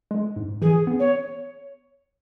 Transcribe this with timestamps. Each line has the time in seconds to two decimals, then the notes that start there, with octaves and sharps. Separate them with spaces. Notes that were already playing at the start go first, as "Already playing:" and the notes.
0.11 G#3
0.36 G#2
0.62 E3 G#4
0.87 B3
1.00 C#5